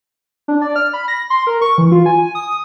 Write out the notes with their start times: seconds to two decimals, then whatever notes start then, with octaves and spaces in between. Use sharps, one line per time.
0.48 D4
0.62 D5
0.76 F6
0.93 B5
1.08 A#6
1.30 C6
1.47 A#4
1.61 C#6
1.78 E3
1.92 F4
2.06 G#5
2.35 D#6